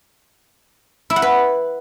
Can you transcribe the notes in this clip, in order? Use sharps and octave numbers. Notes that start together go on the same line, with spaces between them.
E4
F#5
B4